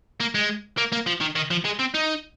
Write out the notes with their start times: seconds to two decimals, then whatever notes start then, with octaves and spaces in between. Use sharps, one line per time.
0.20 A#3
0.35 G#3
0.77 A#3
0.92 A#3
1.07 F3
1.21 D#3
1.36 D#3
1.51 F3
1.65 G#3
1.79 C4
1.94 D#4